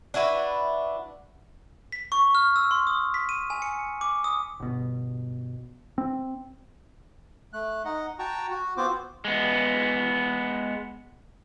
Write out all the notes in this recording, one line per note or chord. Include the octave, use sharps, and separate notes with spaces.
D4 E4 F#4 B4
B6
C#6
F6
E6
C6
D#6
B6
D#7
G#5
C#7
D6
D#6
G1 B2
C4
A3 F#6
D#4 D#5 F#5
F#4 G5 A5 A#5 C#6
F#4
B3 C4 F4 F#4 C5 D6
G#3 B3